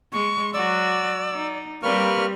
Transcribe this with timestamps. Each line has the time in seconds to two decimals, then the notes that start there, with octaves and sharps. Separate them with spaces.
0.13 G#3 C#6
0.54 F#3 F#4 D5 E6
1.31 D#4
1.83 G3 A#3 C4 G4 B4 C#6 F6